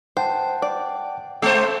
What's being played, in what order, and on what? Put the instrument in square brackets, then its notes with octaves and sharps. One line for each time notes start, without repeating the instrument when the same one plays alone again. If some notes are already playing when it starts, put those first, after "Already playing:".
[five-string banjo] C5 [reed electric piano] F#5 G5 A5
[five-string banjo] D5
[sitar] G#3 A3 C5 [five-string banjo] A4